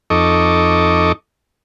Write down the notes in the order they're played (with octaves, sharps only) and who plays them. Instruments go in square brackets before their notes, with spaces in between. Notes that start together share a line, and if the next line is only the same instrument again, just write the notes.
[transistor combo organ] F2 D#4 A4 D#5 C#6 D6